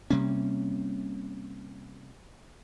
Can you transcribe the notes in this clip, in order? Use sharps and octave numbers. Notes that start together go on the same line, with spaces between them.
C3 G3 A#3 C#4